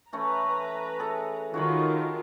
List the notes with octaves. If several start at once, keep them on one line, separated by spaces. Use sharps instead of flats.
E3 A3 C#4 B4 A#5
G#4 A4 E5
D#3 F4 F#4 C#5 B5